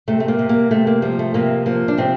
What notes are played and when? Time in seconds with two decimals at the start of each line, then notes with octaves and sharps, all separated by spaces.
0.08 C3 A3
0.20 A3
0.28 A#3
0.39 C3
0.49 A#3
0.71 C3 A3
0.87 A#3
1.02 F3 G3
1.19 A3
1.34 C3 A#3
1.66 F3 A#3
1.88 D4
1.98 C3 C4